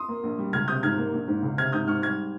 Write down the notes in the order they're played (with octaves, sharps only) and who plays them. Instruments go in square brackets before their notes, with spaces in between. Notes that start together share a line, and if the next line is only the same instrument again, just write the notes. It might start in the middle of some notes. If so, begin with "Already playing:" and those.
Already playing: [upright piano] C6 D#6
A#3
A#1
G3
C#2 F6 G#6
C3 D#6 G6
G#2 F6 G#6
A#3
A#1
G#2
C#2
C3 F6 G#6
G#2 D#6 G6
G#2 C#6 F6
G3 F6 G#6